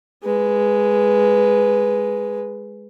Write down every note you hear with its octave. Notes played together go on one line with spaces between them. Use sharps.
G#3 B4